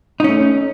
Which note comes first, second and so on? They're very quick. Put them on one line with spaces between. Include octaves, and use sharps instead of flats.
D#4 C#4 A3